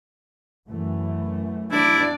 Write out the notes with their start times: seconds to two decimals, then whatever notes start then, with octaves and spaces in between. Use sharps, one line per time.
0.68 F#2 E3 A3
1.71 D4 E4 D5